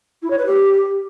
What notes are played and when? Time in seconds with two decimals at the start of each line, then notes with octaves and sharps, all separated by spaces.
0.22 E4
0.30 C#5
0.38 B4
0.46 G4